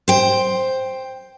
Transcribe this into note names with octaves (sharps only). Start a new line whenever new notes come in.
C5 G5